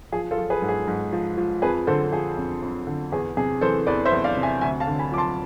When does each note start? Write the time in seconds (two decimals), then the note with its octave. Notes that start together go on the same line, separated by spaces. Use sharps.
0.12 F3 G#4
0.31 F4 A4
0.38 F3
0.50 G#4 B4
0.62 G#2
0.68 G#4
0.87 G#2
1.13 F3
1.38 F3
1.62 F2 G#4 B4
1.87 D3 A4 C5
2.12 F3 G#4
2.37 F2
2.62 F2
2.87 D3
3.12 E2 G#4
3.37 C3 G#4
3.61 E3 A4 C5
3.87 E2 B4 D5
4.05 C5 E5
4.12 E2
4.24 D5 F5
4.37 C3
4.43 E5 G#5
4.61 D2 E5 G#5
4.80 F5 A5
4.87 D3
4.99 G#5 B5
5.12 F3 D6
5.18 A5 C6